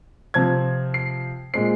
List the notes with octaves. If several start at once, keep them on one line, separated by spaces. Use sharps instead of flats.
C3 F3 C4 G#6
C7
A#2 G#3 C4 C7